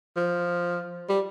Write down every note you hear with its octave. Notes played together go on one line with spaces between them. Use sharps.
F3
G3